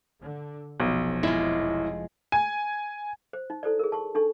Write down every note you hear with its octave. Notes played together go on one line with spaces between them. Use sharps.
D3
F1 B1 F3 F#3
G#3 E4 F4
G#5
C5
D#4
E4 A4 C5 D5
G#4 A#4
A5 C#6
D4 D#4 A4 C#6